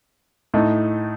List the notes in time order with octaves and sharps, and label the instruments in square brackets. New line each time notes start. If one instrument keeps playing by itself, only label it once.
[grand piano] A2 A3 D#4